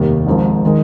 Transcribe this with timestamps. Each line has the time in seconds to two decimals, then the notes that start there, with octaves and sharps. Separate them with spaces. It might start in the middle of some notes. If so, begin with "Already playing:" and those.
Already playing: F1 D#2 D#3 G3
0.27 G#1 G#2 F3 C4
0.65 D#3 G#3